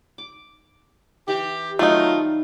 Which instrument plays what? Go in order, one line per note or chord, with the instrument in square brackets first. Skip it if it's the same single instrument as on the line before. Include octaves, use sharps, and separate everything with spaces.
[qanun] D6
[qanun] E3 C#6 [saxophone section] G4
[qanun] D#3 G3 [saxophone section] F#3 F4 [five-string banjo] A3 D#4